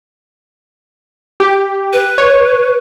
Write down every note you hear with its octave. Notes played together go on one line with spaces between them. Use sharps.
G4
B4
C#5